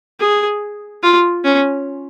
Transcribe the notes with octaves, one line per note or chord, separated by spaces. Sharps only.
G#4
F4
C#4